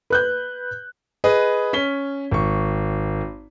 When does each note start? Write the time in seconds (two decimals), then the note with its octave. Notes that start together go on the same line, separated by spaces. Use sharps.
0.10 B4 F#6 G6
1.24 G#4 B4 D#5
1.73 C#4 B6 G7
2.31 G#1 C#6